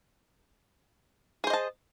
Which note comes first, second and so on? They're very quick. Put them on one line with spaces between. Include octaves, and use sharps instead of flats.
G#4 C5 D#5 A5